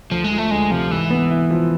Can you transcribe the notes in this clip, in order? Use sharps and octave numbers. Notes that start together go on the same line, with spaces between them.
D2 F3
G#3
F3
A3
D2 G#3
C3 F3
G#2 E3
B3
E4
F3